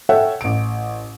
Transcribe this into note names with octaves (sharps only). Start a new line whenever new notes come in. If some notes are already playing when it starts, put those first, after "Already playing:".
A4 C#5 E5 F#5 G5
A1 D7